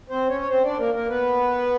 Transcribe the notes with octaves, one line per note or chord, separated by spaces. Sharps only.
C4 C5
C#4 C#5
C#5
C4 C5
D4 D5
A#3 A#4
A#3 A#4
B3 B4